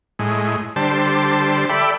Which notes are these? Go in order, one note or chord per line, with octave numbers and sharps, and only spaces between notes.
A2 G#3
D3 G3 C5 A5
A4 D5 E5 G5 B5